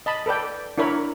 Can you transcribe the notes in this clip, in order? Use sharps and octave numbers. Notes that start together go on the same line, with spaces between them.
D#5 A5 B5
A4 B4 D5 G5
D4 E4 A#4 C#5 B5